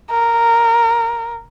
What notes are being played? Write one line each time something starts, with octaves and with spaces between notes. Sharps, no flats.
A#4